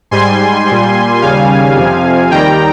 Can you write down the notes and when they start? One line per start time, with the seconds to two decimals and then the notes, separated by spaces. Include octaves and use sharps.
0.11 G#2 G3 G#5 C6
0.66 A#2 G3
1.21 D#2 C#3 G3 F5 G#5
1.76 F2 C3 F3
2.31 D#2 D#3 G3 G5 A#5